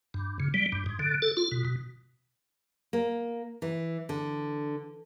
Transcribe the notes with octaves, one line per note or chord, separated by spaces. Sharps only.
G2
C#3
G3
G2
G#2
D3
A4
F4
B2
B2
A#3
E3
D3